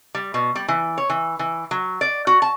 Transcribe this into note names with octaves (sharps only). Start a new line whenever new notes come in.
G3
B2
G3
E3
C#5
E3
E3
F#3
D5
F#4
A5